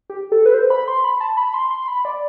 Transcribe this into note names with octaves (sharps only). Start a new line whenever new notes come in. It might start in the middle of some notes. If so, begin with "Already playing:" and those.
G4
A4
B4
C5
B5
C6
B5
A5
B5
C6
C6
B5
D5